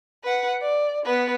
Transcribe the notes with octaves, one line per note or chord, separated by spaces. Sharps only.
B4 F#5
D5
B3 B4